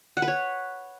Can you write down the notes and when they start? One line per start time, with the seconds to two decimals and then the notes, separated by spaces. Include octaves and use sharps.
0.17 F#5
0.22 B4
0.28 C#5